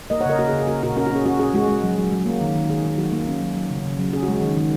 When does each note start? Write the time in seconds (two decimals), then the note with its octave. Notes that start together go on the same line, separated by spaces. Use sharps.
0.10 A#3 A#4 D#5
0.21 C#5 F#5
0.25 C#3 A#4 D#5
0.39 A#3 F#4 A#4
0.48 G#4
0.53 C#3
0.59 G#4
0.67 A#3 F#4 A#4
0.83 A#2 F#4 A#4
0.96 C#4 F#4 A#4
1.07 F#4
1.11 C#4
1.16 G#4
1.26 C#4 F#4
1.39 C#4 G#4
1.54 G#3 F#4
1.68 G#3
1.83 F#3
1.98 F#3
2.12 F#3
2.26 A#3
2.41 D#3
2.56 D#3
2.69 D#3 G#4
2.84 D#3
2.98 F#3 F#4
3.12 A#3
3.28 C#4
3.41 F#3
3.55 F#3
3.71 C#3
3.85 C#3
3.99 F#3
4.13 C#4 G#4
4.23 F#4
4.28 G#3
4.33 F#4
4.41 D#3
4.56 D#3